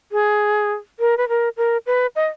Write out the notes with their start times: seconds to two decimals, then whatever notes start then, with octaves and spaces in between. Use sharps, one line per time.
0.12 G#4
1.00 A#4
1.17 B4
1.28 A#4
1.57 A#4
1.86 B4
2.16 D#5